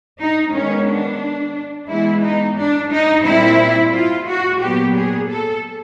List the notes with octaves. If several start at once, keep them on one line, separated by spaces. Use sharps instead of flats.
D#4
D#3 G#3 B3 C#4
D4
E3 G#3 B3 E4
D#4
D4
D#4
A#2 G3 C4 E4
F4
F#4
A#2 F#3 B3 G4
G#4
A4